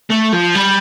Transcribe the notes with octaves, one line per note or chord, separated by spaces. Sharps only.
A3
F3
G3